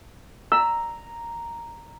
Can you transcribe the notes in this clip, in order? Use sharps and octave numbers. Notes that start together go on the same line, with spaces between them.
A#5 E6